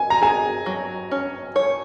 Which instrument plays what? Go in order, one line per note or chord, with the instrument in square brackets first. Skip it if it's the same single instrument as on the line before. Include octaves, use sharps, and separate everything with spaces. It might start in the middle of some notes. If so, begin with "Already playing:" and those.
Already playing: [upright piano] G#5
A#5
[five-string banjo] G#4 [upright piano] G#5
[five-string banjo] F#3
C#4
C#5